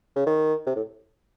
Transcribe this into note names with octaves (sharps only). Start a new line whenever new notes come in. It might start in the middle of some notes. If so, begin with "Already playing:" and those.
C#3
D#3
C3
A2